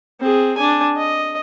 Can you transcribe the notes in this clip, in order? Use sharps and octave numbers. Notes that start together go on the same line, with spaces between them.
C4 G#4
D4 G#5
D#5